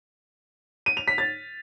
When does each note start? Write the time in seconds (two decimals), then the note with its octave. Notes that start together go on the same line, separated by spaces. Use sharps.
0.86 D#7
0.97 F7
1.08 B6
1.18 A6